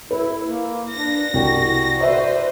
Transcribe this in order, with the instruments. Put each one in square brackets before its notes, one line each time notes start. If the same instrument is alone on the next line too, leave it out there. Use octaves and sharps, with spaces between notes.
[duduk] E4 [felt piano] B4
[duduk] A#3
[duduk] D4 [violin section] A#6
[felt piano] C2 G5 [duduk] F#4
[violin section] B4 C5 [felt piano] D5 E5